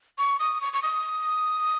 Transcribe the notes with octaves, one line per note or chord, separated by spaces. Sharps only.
C#6
D#6
C#6
C#6
D#6